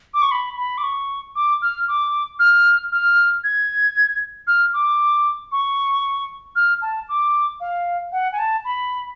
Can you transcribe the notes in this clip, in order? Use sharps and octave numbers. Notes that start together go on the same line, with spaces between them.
D6
C#6
B5
B5
D6
C#6
D6
F6
D6
F6
F6
G#6
F6
D6
C#6
F6
A5
D6
F5
F#5
G#5
A5
B5